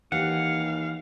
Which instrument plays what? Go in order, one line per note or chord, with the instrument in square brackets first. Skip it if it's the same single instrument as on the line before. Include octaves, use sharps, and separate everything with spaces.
[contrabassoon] D#2 [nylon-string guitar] E3 G4 [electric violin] F5 [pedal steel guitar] F#5